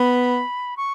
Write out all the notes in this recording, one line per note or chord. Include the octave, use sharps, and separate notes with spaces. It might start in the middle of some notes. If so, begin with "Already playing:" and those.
Already playing: B3 B5
C#6